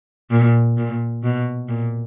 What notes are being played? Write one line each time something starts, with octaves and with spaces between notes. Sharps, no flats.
A#2
A#2
B2
A#2